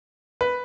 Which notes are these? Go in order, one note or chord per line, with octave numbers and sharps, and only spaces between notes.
B4